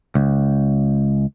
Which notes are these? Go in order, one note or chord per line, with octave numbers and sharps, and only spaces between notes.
C#2